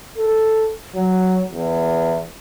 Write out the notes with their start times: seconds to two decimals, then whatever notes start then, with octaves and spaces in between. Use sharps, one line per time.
0.18 A4
0.95 F#3
1.52 E2